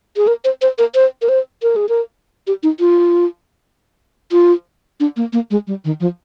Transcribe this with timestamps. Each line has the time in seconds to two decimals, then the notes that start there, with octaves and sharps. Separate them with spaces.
0.17 G#4
0.27 A#4
0.44 C5
0.62 C5
0.78 A#4
0.95 C5
1.22 A#4
1.29 C5
1.63 A#4
1.76 G#4
1.89 A#4
2.47 G4
2.63 D#4
2.80 F4
4.32 F4
5.00 D4
5.17 A#3
5.33 A#3
5.51 G#3
5.67 G3
5.85 D#3
6.00 F3